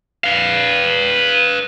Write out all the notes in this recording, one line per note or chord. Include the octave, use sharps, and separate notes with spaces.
B4 F5